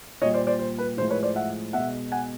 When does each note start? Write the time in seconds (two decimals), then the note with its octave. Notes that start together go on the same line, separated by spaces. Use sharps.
0.22 A#2 C#5 D#5
0.25 G3
0.34 C5 D5
0.47 C5 D5
0.59 C5
0.78 B4
0.97 A2 F3 G#3 C5
1.10 B4 C#5
1.23 C5 D5
1.36 E5 F#5
1.73 B2 G#3 E5 F#5
2.12 F#5 G#5